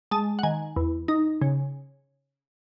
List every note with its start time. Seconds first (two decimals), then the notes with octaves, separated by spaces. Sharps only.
0.11 G#3 A5
0.39 F#5
0.43 D#3 G#5
0.76 E2
1.08 D#4
1.42 C#3